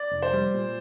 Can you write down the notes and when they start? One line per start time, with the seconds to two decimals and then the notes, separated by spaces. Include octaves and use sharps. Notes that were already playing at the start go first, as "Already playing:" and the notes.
Already playing: D5
0.11 F1
0.22 C5
0.33 G3
0.54 A#2